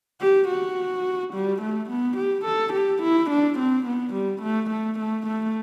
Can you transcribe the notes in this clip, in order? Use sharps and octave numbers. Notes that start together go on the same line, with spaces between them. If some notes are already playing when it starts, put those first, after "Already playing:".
G4
F#4
G3
A3
B3
G4
A4
G4
E4
D4
C4
B3
G3
A3
A3
A3
A3